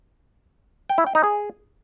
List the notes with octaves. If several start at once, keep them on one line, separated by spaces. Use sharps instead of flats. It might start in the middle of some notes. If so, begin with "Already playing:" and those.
G5
E4
G5
D#4
G#4